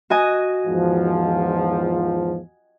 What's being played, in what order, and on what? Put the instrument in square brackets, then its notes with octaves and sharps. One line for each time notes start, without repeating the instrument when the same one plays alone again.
[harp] F#4 D#5 G#5
[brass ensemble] E2 G#2 F3